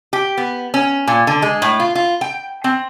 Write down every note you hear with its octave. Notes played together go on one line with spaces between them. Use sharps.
G4
B3
C#4
A#2
D3
G#3
A2
F4
F4
G5
C4